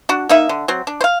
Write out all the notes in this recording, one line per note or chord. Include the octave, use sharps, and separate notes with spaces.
D4 F#4
A#3 D#4 E5
D3
F#3 C4
D4
C5 F5